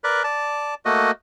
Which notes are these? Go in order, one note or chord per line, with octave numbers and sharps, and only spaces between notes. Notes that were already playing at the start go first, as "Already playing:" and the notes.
A#4 B4 D5
D5 A5
A3 A#3 F#4 D#5